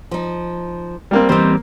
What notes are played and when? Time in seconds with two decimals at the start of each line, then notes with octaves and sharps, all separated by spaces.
0.11 F3 D#4
1.11 G3 A#3 C4
1.29 E2 G3 A#3 C4 D#4 C5